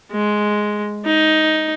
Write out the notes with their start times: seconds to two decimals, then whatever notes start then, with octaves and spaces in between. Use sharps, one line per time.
0.12 G#3
1.05 D#4